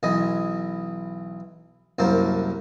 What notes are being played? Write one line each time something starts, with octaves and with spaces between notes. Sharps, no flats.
B1 E3 D#5 G#5
C2 F#2 A#3 C5 A5